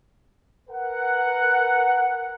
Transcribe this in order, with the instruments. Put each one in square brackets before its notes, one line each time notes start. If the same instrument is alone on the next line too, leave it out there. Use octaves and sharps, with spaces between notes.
[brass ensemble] A#4 B4 F#5